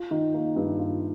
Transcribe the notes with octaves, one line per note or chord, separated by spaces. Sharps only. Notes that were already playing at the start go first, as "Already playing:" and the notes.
Already playing: F4
D#3
A#3
G2
F4